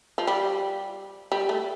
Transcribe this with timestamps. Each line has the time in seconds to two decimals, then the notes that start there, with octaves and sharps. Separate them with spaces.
0.18 F3
0.27 G3
1.32 G3
1.49 A3